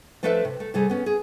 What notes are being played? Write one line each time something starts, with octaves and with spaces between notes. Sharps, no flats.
F3 A3 D4 A4 B4 E5
C3
A3
C3 G3 A3 G#4
B3 C#4
G#4